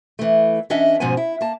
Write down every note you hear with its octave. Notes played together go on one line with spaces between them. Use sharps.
E3 A3
E3 C#4 D4 D#5 E5 F#5
G#2 B2 F3 C#4 F#5 G#5
E4
A#3 A5